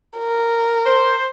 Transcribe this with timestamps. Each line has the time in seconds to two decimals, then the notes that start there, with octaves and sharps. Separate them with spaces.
0.19 A#4
0.85 C5